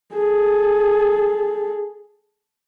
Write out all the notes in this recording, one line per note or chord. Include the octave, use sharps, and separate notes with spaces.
G#4 A4